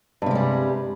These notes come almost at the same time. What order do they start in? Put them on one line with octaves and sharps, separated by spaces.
G2 C3 G#3 G3